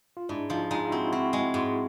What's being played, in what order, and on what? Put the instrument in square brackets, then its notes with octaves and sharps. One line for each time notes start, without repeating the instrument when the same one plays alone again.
[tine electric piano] F4
[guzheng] G#2 [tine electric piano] D4 E4
[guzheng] F3 [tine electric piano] D#4 F4
[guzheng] G#3 [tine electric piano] D#4 F4
[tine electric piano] F4
[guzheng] C4 [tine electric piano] E4 F#4
[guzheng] C4 [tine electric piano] E4 F#4
[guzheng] G#3
G#2